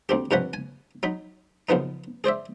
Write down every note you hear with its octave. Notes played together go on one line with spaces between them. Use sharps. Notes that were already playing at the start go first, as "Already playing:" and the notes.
D2 C4 G4
G2 C3 F3 C#4 F#5 B5
G#5
F#3 D#4 B5
F#2 C#3 F3 B3 D#4
G#4 C5 D5 E5